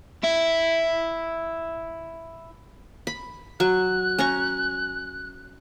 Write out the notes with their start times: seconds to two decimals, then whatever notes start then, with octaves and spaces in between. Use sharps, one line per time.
0.24 E4 E5
3.07 B5
3.60 F#3 C#6 F#6
4.19 C#4 A#5 C#6